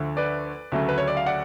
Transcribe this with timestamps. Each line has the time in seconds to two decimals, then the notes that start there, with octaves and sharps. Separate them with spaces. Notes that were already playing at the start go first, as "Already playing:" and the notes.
Already playing: D2 D3 F3 A3
0.17 B4 D5
0.72 D2 C#3 F#3 A3
0.89 B4
0.98 C#5
1.08 D5
1.17 F5
1.26 D5 F#5